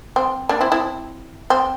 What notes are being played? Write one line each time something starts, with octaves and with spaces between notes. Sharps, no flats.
C4
A#3 D4
C4 E4
C4 E4
C4